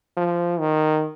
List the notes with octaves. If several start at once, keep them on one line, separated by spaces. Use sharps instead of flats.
F3
D#3